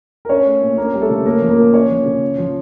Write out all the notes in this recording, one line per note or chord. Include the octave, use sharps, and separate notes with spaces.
A#4
C#4 C#5
A3
A#2
A#3 C#4 A#4
G3
A3 A4
C#3
A#3 C#4 A#4
F3
A#3 A#4
A#2
C#4 C#5
F3
C#3
C#4
F3